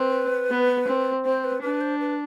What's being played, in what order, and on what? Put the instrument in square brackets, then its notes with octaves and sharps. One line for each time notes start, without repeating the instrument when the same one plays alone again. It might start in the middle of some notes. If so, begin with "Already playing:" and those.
Already playing: [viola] C4 [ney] B4
[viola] B3
C4
[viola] C4 [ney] C5
[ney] B4
[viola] D4 [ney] B4
[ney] C5
B4